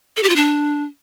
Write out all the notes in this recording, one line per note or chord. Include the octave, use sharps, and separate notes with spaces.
A4
G4
F4
D4